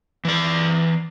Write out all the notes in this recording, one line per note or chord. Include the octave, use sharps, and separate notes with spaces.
E3 D5